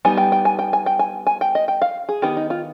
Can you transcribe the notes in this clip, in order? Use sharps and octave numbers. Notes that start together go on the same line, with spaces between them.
G3 B3 D#4 G#5
G5
G5
G#5
G5
G#5
G5
G#5
G#5
G5
D#5
G5
F5
G#4
D#3 B3 D#4 G4
D#4
F4